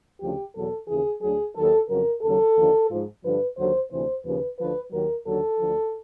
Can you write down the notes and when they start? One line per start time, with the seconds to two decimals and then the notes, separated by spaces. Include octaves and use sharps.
0.20 D2 C#3 F3 G4
0.54 E2 B2 F#3 A4
0.88 D#2 C#3 E3 G#4
1.21 D2 D3 F#3 G#4
1.55 D#2 D#3 F#3 A4
1.88 F2 C#3 F#3 A#4
2.22 D#2 C#3 F#3 A4
2.56 D#2 D3 F3
2.89 G#2 F3
3.23 G2 D3 F3 B4
3.57 D#2 D3 F#3 C5
3.91 D2 C3 E3 C5
4.24 D#2 C#3 F3 B4
4.58 D2 D3 F3 B4
4.92 D#2 D#3 F#3 A#4
5.26 D#2 D3 F#3 A4
5.60 D2 D3 F3